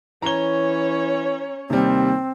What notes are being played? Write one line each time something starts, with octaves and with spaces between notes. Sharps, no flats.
E3 C#4 C#5 A#5 G7
D#2 C3 G3 C4